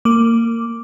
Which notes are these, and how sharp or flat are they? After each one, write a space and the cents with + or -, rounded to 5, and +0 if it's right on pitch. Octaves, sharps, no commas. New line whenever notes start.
A#3 -25 D6 +0